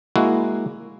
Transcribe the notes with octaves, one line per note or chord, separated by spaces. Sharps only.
G#3 A#3 E4 F#4